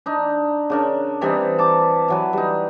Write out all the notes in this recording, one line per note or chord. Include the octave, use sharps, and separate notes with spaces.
D4 D#4
C#3 D4 A#4
E3 G3 C4 D#4
A5 D6
E3 F#3 B4
G3 D#4